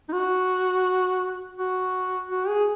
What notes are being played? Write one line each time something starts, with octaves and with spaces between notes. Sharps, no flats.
D#4
F#4
F#4
F#4
G#4